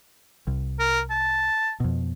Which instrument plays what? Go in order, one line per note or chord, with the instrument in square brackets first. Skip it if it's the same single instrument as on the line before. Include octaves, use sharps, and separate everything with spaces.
[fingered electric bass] C2
[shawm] A#4
A5
[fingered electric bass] F2 B2